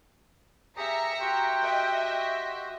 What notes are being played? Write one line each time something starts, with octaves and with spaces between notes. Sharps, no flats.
G4 G#4 E5 A#5 C#7
F#4 G4 G5 C6
D#5 E5